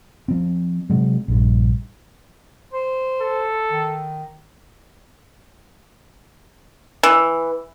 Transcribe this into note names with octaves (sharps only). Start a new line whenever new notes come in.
F3 C4
C3 F#3 G#3
A#1 G2
C5
A4
D#3
E3